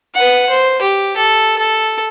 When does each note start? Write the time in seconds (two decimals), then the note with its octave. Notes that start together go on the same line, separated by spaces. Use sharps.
0.15 B4 F#5
0.50 C5
0.82 G4
1.17 A4
1.59 A4